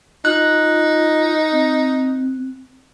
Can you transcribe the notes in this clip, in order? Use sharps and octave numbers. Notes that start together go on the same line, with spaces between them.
D#4 F4 F#6
C4